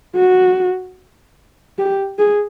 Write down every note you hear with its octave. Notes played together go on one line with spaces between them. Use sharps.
F#4
G4
G#4